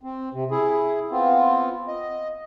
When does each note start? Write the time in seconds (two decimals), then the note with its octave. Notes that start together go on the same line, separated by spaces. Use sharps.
0.03 C4
0.33 C3
0.51 E4 G#4
1.11 B3 C4 F4
1.88 D#5